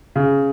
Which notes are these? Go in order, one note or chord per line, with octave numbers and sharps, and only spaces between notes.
C#3